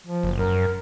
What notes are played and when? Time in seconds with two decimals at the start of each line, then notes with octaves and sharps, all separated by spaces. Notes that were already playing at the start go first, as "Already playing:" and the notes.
0.07 F3
0.23 F#1
0.39 F#2 A#4